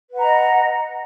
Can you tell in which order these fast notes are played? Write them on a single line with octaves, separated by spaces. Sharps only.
B4 F#5 A#5 D#5